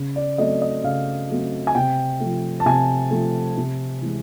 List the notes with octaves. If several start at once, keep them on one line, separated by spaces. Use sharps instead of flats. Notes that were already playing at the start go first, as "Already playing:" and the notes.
Already playing: C#3
D5
F#3 A3 C4 D#5
D#5
C#3 F5
F#3 A3 C4
G#5
C3 G5
F3 A3
A5
C3 G#5
F3 A3
C3
E3 G#3